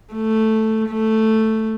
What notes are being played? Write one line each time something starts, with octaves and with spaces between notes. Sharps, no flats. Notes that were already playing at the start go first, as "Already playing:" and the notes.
A3
A3